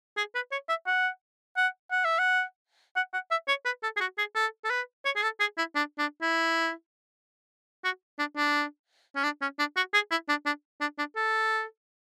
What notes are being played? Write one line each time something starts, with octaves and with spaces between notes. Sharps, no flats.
G#4
B4
C#5
E5
F#5
F#5
F#5
E5
F#5
F#5
F#5
E5
C#5
B4
A4
G#4
F#4
G#4
A4
A4
B4
C#5
G#4
A4
G#4
E4
D4
D4
E4
F#4
D4
D4
C#4
D4
C#4
D4
F#4
G#4
E4
D4
D4
D4
D4
A4